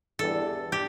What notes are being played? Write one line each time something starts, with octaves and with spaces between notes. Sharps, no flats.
E2 E3 G3 D4 A4
G4